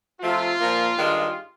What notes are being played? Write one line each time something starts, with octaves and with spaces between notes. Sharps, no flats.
C3 F3 A3 F4
A#2 F3 A#3
G2 D#3 G#3